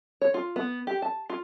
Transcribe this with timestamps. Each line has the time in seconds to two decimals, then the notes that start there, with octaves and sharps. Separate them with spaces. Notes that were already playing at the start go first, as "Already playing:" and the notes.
0.22 C#5
0.34 F4
0.56 B3
0.87 G4
1.02 A5
1.30 F4